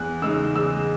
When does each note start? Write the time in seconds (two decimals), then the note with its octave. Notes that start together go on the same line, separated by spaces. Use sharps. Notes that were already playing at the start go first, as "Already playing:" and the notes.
Already playing: E2 F#6
0.22 C#3 G#3 D#4 E6
0.56 E2 E6